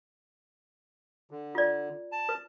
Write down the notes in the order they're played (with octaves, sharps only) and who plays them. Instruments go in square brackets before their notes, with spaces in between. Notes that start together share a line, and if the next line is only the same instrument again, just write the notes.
[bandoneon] D3
[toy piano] F4 D5
[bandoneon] A5
[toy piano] B4